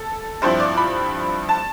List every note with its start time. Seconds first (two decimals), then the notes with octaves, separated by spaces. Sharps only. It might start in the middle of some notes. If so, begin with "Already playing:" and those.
Already playing: A4
0.42 G2 F3 C4 E4 C5
0.60 D5
0.77 B5
1.49 A5